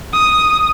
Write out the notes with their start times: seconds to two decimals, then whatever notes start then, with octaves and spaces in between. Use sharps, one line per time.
0.13 D#6